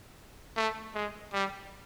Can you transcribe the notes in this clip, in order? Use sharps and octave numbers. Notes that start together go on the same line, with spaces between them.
A3
G#3
G3